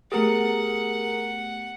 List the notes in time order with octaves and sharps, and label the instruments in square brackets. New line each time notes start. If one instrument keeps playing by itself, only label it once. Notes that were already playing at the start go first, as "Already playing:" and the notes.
[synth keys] A3 B3 G4 [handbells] G#4 A#4 A#5 [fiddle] F#5